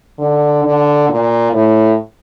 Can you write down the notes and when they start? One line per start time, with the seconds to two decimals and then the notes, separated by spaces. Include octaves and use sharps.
0.19 D3
0.64 D3
1.09 A#2
1.53 A2